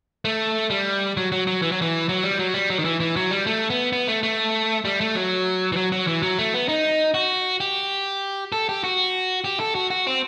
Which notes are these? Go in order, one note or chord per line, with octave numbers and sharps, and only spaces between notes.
A3
G3
F#3
F#3
F#3
E3
F#3
E3
F#3
G3
F#3
G3
F#3
D#3
E3
E3
F#3
G3
A3
B3
B3
A3
A3
G3
A3
F#3
E3
F#3
F#3
E3
F#3
A3
B3
D#4
F#4
G4
A4
G4
F#4
G4
A4
F#4
F#4
C4